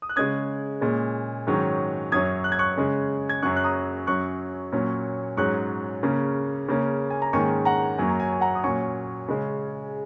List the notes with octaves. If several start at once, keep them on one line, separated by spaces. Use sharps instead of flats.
D#6
F#6
C#3 G#3 C#4 D#6 G#6
A#2 G#3 C#4
G#2 D#3 F#3 C#4
F#2 F#3 C#4 D#6 G#6
F#6
G#6
C#6 F#6
C#3 G#3 C#4
G#6
F#2 F#3 C#4 C#6 F#6
F#6
A#5 D#6
F#2 F#3 C#4 C#6 F#6
A#2 F#3 C#4
G#2 F#3 C#4 C#6 F#6
C#3 A#3 C#4
C#3 A#3 C#4
G#5
A#5
G#2 D#3 A#3 C#4 G#5 C#6
F#5 A#5
F#2 F#3 A#3 C#4 G#5
A#5
G#5
G#5
F#5 A#5
D#6
A#2 F#3 C#4 G#5 C#6
C#3 G#3 C#4